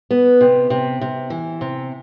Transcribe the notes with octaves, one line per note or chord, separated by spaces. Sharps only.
B3
C3
C3
C3
E3
C3